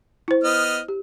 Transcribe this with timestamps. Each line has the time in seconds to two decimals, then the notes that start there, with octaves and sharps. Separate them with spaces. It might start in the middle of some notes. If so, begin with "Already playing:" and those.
0.28 E4 C5
0.44 B3 D#5 F6
0.88 G4